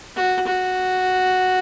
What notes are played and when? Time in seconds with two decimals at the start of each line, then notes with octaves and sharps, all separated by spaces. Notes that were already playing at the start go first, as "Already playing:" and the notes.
0.16 F#4
0.47 F#4